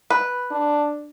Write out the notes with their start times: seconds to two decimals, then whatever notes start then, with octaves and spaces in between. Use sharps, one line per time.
0.10 B4
0.51 D4